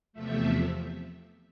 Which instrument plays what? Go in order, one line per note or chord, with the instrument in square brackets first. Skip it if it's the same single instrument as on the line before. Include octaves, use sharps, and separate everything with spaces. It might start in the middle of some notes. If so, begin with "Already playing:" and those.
[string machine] E2 C3 F3 A3 E5